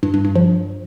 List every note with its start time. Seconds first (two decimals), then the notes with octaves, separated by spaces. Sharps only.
0.03 G2
0.14 G2
0.25 G2
0.35 F3